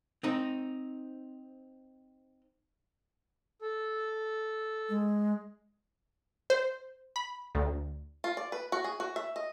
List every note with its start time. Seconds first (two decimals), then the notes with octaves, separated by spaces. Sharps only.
0.23 C4 D#4
3.61 A4
4.89 G#3
6.50 C5
7.16 B5
7.55 D2
8.24 F4
8.37 D5
8.52 B4
8.72 F#4
8.84 G#4
9.00 F#4
9.16 E5
9.36 D#5